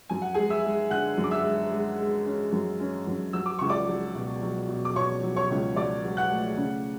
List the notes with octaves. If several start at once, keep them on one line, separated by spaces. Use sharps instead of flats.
F#2 G#5
F#5
G#3 G#4 G#5
E5 E6
G#3
D3 F#5 F#6
F#2
D6
E5 E6
G#3
G#3
G#3
C#4
F#2
C#4
F#2
F#3 E6
D6
C#2 C#6
D5 D6
F#3
B2
F#3
B2
D6
B2 C#5 C#6
F#3
C#5 C#6
C#2
F#3 D5 D6
F#3
F#5 F#6
A3
C#3